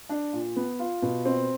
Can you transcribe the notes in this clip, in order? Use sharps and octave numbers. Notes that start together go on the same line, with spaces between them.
D4
A#2
B3
F4
B2
C4